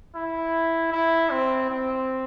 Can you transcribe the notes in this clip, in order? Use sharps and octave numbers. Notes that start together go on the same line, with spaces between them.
E4
E4
C4
C4